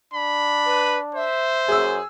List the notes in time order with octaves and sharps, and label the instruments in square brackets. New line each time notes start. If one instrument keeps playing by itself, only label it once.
[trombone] D4 [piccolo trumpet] B5
[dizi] B4
[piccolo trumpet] C5 [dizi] E5
[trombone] F#2 [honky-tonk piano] G#4 E6